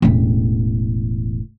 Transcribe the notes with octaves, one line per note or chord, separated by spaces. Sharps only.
E1 A1